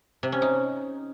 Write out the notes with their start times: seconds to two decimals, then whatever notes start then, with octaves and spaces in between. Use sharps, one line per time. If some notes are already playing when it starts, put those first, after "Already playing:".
0.23 C3
0.32 C#4
0.42 D#4